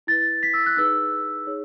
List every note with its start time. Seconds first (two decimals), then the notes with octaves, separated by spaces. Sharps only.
0.07 E4 B4 A6
0.43 B6
0.54 E6
0.66 F#6
0.77 D#4 G#4 B4 E6
1.47 D#4 G#4 C#5